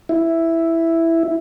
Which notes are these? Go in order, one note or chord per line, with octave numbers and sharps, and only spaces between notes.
E4